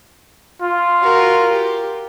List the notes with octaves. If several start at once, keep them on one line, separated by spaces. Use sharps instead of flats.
F4
F#4 A#4
G4